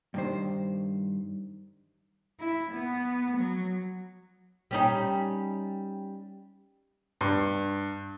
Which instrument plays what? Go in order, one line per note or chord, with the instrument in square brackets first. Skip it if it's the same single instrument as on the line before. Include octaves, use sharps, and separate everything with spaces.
[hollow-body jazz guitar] G2 D#3 C5
[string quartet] E4
B3
F#3
[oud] G3 C#4 D#4
[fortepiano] G2